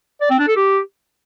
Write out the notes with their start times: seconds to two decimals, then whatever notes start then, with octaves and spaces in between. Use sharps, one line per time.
0.21 D5
0.30 C4
0.39 D4
0.48 A4
0.56 G4